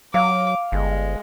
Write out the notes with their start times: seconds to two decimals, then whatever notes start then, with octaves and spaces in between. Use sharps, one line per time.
0.14 F#3 F5 D6
0.72 G1 G#3